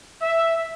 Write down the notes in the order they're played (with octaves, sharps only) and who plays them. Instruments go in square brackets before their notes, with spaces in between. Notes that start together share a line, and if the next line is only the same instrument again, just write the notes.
[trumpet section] E5